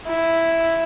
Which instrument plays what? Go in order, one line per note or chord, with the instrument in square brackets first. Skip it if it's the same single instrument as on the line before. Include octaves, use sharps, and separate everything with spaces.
[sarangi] E4